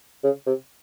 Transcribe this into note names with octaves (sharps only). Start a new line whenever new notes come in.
C#3
C3